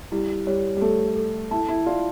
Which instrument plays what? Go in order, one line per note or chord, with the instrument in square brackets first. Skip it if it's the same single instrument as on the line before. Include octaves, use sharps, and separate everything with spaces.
[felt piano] G3 [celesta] E4
[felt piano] G3 [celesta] C#5
[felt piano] G3
[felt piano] A3 [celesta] A4
[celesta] A4
[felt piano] E4 [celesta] A5
[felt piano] E4
[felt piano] F4 [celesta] D5